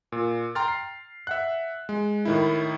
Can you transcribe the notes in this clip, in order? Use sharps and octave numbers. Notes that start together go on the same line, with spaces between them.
A#2
G5 A#5 C6 F6 A6
C7
E5 F#5 F#6
G#3
A2 D#3 E4